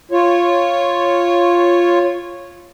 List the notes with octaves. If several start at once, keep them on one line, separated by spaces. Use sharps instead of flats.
F4 C#5